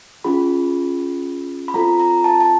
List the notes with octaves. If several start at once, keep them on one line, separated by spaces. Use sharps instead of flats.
C#4 F4 G#4 B5
B5
C4 F4 A4 A#5
A#5
A5
A5